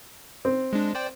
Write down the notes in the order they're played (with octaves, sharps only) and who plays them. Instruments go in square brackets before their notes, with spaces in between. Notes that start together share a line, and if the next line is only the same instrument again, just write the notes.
[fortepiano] C4
[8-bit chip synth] G#3 D4
C5 D5 G5